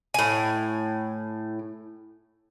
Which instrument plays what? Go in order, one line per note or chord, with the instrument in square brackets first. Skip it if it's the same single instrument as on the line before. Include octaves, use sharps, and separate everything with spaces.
[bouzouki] A2 G#5